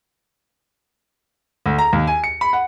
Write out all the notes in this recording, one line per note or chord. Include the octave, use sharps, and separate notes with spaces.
D2
A#5
D#2
G#5
C#7
B5
F#5